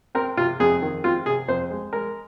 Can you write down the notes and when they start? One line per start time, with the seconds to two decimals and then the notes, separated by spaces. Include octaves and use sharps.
0.15 C4 A#4
0.37 C3 F4
0.60 F2 G#4
0.82 D#3
1.04 C4 F4
1.26 C3 G#4
1.48 F2 C5
1.71 G#3
1.93 G#3 A#4